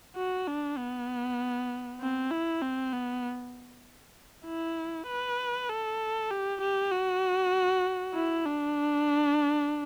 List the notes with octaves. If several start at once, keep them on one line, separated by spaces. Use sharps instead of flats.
F#4
D4
B3
C4
E4
C4
B3
E4
B4
A4
G4
G4
F#4
E4
D4